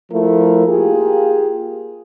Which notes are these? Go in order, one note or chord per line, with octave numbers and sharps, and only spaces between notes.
F3 A3 E4 A#4
A#3 F4 G4 G#4